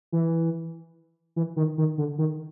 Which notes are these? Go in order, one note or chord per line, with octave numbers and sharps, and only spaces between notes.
E3
E3
D#3
D#3
D3
D#3